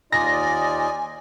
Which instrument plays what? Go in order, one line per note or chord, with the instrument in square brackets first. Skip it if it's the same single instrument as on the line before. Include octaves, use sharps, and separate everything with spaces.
[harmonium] D#2 D#4 F4 [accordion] D5 D#5 [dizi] G#5 [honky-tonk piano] A#6